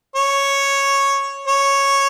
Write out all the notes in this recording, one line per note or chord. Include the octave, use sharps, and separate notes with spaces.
C#5
C#5